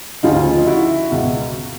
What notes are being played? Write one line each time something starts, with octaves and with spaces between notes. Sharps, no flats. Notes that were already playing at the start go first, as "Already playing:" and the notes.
D2 C#3 F3 D#4 F4
E4 F#4
C#2 B2